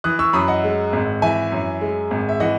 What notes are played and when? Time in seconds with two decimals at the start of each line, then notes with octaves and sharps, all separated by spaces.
0.04 E3 D#6 F#6
0.19 C#6 E6
0.33 F#2 B5 D#6
0.48 D#5 F#5
0.64 G#3
0.93 G#1
1.22 E3 E5 G#5
1.52 F#2
1.81 G#3
2.11 G#1
2.29 E5
2.40 E3 D#5 F#5